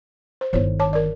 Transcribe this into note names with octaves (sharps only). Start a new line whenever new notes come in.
C5
G1 D#3 E4 C5 C#5
C#5 A5 D6
A#4 D5